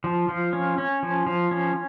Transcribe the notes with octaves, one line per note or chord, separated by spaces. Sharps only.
F3
F3
C#4
C#4
F3
F3
C#4